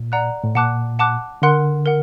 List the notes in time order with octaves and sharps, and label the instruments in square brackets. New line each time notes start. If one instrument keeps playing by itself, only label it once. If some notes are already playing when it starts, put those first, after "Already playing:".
Already playing: [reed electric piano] A#2
[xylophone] D5 F#5 A#5 F#6
[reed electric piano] A2
[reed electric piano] A#2 [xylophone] F#5 A5 D6 F#6
[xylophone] F#5 A5 D6 F#6
[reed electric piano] D3 [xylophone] A#4 F#5 C6 F#6
[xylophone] A#4 F#5